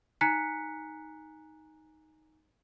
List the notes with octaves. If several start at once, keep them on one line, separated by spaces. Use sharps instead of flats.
D#4 G#5 A#5 F#6 B6 C#7